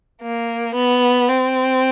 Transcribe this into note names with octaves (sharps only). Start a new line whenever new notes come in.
A#3
B3
C4